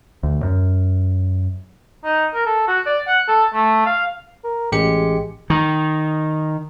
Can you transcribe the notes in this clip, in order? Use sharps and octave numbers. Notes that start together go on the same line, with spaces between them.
D2
F#2
D#4
A#4
A4
F#4
D5
F#5
A4
A3
F5
A#4
A1 G#3 G4 C#7
D#3